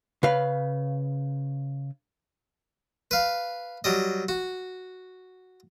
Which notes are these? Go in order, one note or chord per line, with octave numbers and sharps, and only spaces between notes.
C#3 B4 F5
B4 F5
F#3 G3 D#5
F#4